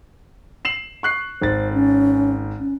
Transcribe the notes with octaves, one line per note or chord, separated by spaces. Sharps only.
C7 E7 F#7
C#6 F#6 C7
G#1 C5 A6
C#4
C#4